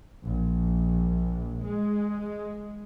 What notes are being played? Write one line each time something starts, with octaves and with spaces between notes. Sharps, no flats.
A#1
G#3